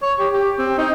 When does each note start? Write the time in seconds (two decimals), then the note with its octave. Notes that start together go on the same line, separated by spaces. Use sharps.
0.02 C#5
0.19 G4
0.33 G4
0.58 C4
0.78 D#4